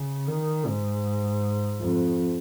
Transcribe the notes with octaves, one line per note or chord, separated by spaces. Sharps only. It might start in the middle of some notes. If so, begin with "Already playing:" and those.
Already playing: C#3
D#3
G#2
F2